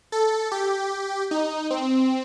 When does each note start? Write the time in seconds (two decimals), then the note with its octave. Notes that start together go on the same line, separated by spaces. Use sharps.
0.12 A4
0.52 G4
1.31 D#4
1.71 C4